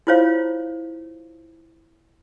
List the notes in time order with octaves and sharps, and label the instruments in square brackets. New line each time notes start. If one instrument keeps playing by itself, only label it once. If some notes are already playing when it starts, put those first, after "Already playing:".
[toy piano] E4 F4 C5 C#5 F5